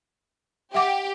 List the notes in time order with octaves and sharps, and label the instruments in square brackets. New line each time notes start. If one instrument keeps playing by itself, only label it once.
[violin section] G4 [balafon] E5 F#5 D6